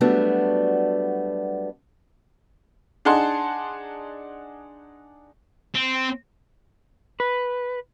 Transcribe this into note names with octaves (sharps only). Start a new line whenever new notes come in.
F#3 G3 A3 B3 D4 F#4
D4 D#4 G#4 F#5 A5 C6
C4
B4